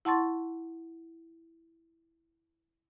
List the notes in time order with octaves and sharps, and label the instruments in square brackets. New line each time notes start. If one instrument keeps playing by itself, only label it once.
[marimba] E4 F#5 A5 C6 C#6 A6